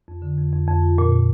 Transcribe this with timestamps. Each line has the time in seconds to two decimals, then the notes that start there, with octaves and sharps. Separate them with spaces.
0.08 F2
0.22 D3
0.38 F2
0.52 F2
0.68 F2
0.82 F4
0.98 A#2
1.12 A#2